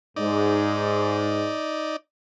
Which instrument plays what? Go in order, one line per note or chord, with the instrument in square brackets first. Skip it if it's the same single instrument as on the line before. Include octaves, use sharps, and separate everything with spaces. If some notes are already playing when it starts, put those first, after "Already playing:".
[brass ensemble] G#2 [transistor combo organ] D#4 D5